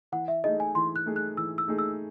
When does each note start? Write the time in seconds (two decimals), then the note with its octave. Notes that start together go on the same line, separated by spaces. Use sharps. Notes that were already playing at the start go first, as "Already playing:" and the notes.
0.12 E3 F#5
0.28 E5
0.44 A3 D#4 G#4 D#5
0.60 G#5
0.75 E3 C6
0.96 F#6
1.06 A3 D#4 G#4
1.16 F#6
1.37 E3 E6
1.58 E6
1.68 A3 D#4 G#4
1.79 E6